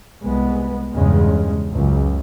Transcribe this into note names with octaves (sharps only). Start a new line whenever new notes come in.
C2 G#3 B3
E2 G2 C#3 G#3
C#2 F#2